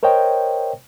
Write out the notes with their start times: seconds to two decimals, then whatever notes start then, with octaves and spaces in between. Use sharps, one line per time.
0.03 A#4 C5 C#5 D#5 G5